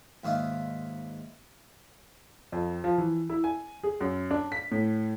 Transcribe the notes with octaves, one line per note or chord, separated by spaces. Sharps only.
D#2 G#2 E4 F4
F2
F3
E3
E4
G#5
G#4
F#2
D4
B6
A2